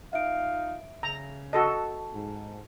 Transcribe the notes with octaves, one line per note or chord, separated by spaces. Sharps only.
D#4 F4 E5 F5 D7
C#3 A#5
F#4 A4 D#5 A5
G#2